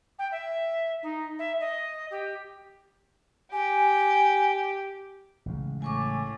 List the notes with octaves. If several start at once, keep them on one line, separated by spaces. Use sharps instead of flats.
G5
E5
D#4
E5
D#5
G4
G4 G#5
A1 C#3 G#3
A2 G#5 C#6 D6